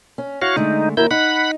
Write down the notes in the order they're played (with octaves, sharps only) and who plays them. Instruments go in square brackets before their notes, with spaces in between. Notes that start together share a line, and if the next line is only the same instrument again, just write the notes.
[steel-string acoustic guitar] C#4
[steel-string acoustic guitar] E4 [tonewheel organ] F#4 C#5 F5
[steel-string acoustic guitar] D3 G#3 A3 [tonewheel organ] D#4
[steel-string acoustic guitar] D#2 F#4 A#4 [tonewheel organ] E4 G6
[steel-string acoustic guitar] D#4 [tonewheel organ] F#5 B5